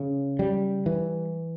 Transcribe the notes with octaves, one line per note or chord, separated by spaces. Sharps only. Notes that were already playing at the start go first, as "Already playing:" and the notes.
Already playing: C#3
G3
E3